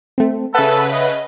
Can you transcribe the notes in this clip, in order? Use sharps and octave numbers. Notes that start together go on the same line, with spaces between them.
A3 C4
C#3 A4 B4 E5 F#5
D#5